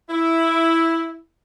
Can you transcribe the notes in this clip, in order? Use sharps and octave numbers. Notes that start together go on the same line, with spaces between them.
E4